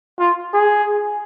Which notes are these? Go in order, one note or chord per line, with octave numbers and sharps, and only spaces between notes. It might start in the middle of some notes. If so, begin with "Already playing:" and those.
F4
G#4